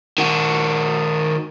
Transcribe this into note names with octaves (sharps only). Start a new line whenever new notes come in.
D#3 F#4